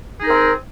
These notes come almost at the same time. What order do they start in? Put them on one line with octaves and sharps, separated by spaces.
G#4 D#4 A#4 C4